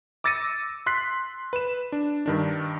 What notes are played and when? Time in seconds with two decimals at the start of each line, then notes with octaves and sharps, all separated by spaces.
0.24 D6 E6 A6 A#6 C#7 D#7
0.86 C6 F#6 B6 C7
1.53 B4 E7
1.92 D4
2.26 G2 D#3 D4